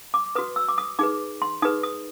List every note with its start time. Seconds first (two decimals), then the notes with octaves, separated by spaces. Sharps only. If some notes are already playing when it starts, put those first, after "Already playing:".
0.14 D6
0.35 F#4 B4 D#6
0.56 E6
0.68 D6
0.78 D#6
0.99 D#4 G#4 B4 D6
1.42 C6
1.62 D#4 G#4 B4 D#6
1.83 D#6